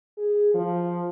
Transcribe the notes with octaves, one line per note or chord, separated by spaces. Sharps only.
G#4
F3